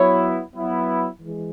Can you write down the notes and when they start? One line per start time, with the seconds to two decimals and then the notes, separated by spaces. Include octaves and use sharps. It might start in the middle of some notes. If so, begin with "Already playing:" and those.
Already playing: F#3 B3 E4 C#5
0.54 F#3 B3 E4
1.21 E3 G#3